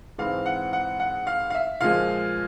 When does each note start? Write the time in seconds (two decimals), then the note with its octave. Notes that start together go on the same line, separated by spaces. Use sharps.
0.18 G#2 E3 G#3 C4 F5
0.46 F#5
0.73 F#5
1.00 F#5
1.27 F5
1.50 F5
1.55 E5
1.81 A#2 F3 G#3 F5